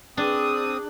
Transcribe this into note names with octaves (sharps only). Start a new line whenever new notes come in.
C4 D4 G#4 D#6